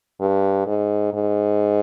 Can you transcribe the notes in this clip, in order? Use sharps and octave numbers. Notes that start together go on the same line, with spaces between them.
G2
G#2
G#2